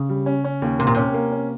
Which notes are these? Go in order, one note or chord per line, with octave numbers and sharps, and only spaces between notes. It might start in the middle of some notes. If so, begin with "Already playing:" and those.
Already playing: C#3
G3
C#4
C#4
D#2
C3 A#3
A#2
C3 C#4
A#3
C#4